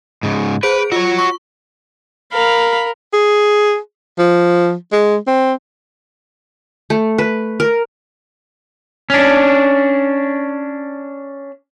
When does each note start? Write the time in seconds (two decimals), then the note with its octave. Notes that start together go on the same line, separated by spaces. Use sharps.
0.23 G#2 C#3
0.63 G#4 B4 C5 D7
0.92 F4 F#4 C#5
1.19 C#6
2.32 A#4 F5 B5
3.14 G#4
4.19 F3
4.93 G#3
5.27 C4
6.90 A3
7.18 B4
7.60 A#4
9.10 C#4 D4